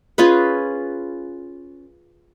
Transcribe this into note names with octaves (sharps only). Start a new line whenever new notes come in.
C#4 F4 G#4 B4